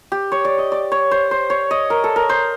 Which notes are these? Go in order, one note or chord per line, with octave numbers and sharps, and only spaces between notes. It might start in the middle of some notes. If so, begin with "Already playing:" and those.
G4
C#5
D5
D#5
D5
C#5
C5
C5
C#5
D#5
A#4
A4
A#4
C5